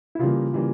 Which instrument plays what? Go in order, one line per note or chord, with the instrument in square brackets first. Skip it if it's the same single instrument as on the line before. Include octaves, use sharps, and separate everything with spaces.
[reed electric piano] E4
[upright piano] C#3 E3 G3 A#3 [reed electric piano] F4
[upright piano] C#3 E3 G3 A#3